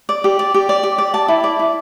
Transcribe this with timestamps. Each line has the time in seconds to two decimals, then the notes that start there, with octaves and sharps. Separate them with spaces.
0.09 D5
0.24 G4
0.39 D5
0.54 G4
0.69 D5
0.83 G4
0.98 D5
1.14 G4 A5
1.28 E4
1.44 D5
1.59 E4